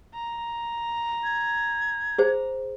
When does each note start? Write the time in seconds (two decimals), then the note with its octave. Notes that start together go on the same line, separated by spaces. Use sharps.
0.15 A#5
1.24 G#6
2.18 G#4 C5